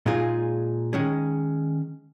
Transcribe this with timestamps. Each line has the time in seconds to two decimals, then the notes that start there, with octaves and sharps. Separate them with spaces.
0.06 A#2 G#3 D#4 F4 G#4
0.93 D#3 G#3 C#4 G#4